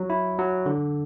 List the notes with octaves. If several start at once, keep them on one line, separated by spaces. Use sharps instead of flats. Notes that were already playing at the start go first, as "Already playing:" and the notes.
Already playing: F#3
E4
F#3
D3